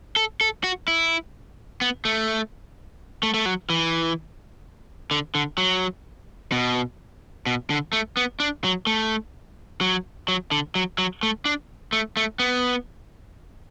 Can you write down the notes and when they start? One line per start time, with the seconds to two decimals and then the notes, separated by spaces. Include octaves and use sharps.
0.16 A4
0.41 A4
0.64 F#4
0.88 E4
1.81 B3
2.05 A3
3.23 A3
3.34 A3
3.46 F#3
3.70 E3
5.11 D3
5.35 D3
5.58 F#3
6.52 B2
7.46 B2
7.70 D3
7.93 A3
8.17 B3
8.40 D4
8.64 F#3
8.87 A3
9.81 F#3
10.28 F#3
10.51 D3
10.75 F#3
10.98 F#3
11.23 A3
11.45 D4
11.93 A3
12.17 A3
12.39 B3